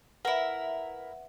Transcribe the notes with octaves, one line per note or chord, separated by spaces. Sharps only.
E4 A#4 B4 E5 F#5